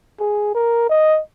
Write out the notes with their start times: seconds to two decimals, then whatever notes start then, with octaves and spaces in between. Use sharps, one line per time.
0.20 G#4
0.54 A#4
0.89 D#5